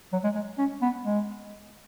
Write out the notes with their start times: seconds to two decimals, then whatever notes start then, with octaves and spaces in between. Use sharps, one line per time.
0.13 F#3
0.24 G#3
0.35 G#3
0.58 C#4
0.82 B3
1.05 G#3